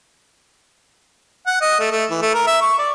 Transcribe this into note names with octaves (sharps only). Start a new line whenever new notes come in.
F#5
D#5
A3
A3
E3
A3
A#4
E5
C#6
D5